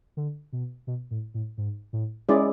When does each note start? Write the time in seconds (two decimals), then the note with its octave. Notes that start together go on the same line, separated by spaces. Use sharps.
0.17 D3
0.53 B2
0.87 B2
1.11 A2
1.34 A2
1.58 G#2
1.93 A2
2.29 G#3 C#4 E4 G#4 D5